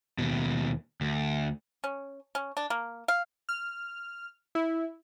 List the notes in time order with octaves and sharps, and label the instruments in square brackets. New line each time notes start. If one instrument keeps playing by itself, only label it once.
[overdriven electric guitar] D#2 B2
D2
[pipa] C#4
C#4
D4
A#3
F5
[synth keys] F6
E4